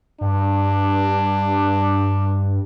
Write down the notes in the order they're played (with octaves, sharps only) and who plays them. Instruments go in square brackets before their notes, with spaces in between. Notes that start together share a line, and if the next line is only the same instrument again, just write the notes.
[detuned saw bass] G2 [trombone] D4